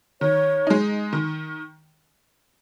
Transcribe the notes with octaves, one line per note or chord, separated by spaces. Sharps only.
D#3 C#5
G#3 D#4
D#3